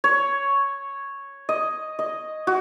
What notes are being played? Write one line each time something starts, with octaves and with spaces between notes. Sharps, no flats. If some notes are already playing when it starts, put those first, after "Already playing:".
C#5
D#5
D#5
F#4